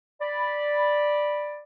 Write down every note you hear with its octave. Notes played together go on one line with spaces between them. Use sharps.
D5 B5